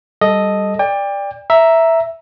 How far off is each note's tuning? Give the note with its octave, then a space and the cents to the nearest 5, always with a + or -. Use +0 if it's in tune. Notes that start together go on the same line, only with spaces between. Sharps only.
G3 +0 A4 -10 D#5 +0
D5 +0 G5 +30
E5 +0 A#5 +0